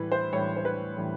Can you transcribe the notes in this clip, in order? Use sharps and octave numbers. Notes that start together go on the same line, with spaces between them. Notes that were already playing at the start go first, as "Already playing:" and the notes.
Already playing: A2 E3 G3 B4
C5
A2 E3 G3 C#5
C5
B4
A2 E3 G3